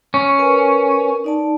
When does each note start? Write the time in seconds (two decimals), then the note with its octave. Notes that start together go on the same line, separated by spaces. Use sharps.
0.14 C#4
0.39 A#4 B4 G#5
1.24 D#4 D5 A5